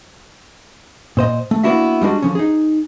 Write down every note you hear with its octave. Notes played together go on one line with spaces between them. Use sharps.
A#2 C5 D#5
A3
A#3 B3 D4 E4 F#4 E5
G3 G#3 D4 F#4
D3 F3 C#4
D#4 G#4